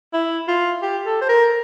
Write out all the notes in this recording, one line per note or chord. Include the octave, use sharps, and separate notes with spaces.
E4
F4
G4
A4
C5
A#4